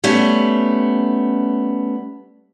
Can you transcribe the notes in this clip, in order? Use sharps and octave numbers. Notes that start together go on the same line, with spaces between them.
G3 A3 B3 C#4